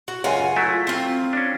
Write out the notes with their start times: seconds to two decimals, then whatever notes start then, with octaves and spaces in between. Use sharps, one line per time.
0.08 F#4
0.24 C#2 F#2 F4 F#5 G#5
0.56 F#3 A3 E4
0.87 C4 F4
1.33 C#4 D4